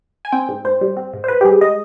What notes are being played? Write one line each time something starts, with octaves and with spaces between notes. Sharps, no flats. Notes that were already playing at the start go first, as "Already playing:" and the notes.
G#5
C4 G5
G#2
G#2 C5
G3
C4
G#2
C5
G#2 B4
G4
G3 G#4
G#3 D#5